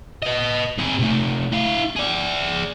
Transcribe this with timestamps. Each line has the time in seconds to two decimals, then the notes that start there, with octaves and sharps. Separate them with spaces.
0.23 B4 D#5
0.78 C4 G#4
0.99 C3 A3
1.52 E4 F5
1.96 G#4 D5